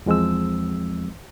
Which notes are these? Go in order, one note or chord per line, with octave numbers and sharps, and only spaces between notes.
E2 F3 G#3 C4 E6